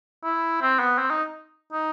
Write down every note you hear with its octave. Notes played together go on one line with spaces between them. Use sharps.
E4
C4
B3
C4
D#4
D#4